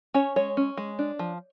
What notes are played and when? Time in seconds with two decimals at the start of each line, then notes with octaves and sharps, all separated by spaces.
0.14 C#4 C#5
0.36 G#3 C#5
0.57 C#4
0.77 G#3
0.99 D4
1.19 F3